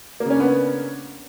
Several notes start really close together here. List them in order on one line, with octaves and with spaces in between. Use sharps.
A#3 C#3 C#4 D4 B3